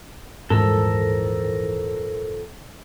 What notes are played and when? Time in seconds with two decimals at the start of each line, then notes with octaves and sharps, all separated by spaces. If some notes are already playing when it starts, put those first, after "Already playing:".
0.50 D#1 F2 G#2 E3 A4 A#4 E6